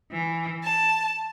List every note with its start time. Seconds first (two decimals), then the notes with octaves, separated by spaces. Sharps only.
0.13 E3
0.64 A5